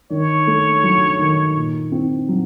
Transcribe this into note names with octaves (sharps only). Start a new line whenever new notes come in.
D#3 C#5
A3
F#3
D#3
A#2
C4
F#3